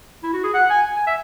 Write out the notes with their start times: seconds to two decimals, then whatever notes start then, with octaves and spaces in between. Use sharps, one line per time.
0.23 E4
0.33 F#4
0.44 G#4
0.54 F#5
0.70 G#5
0.96 G#5
1.07 E5